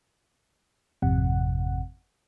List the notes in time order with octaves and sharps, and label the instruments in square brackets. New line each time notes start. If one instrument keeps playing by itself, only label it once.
[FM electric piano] G#1 F2 C3 F#5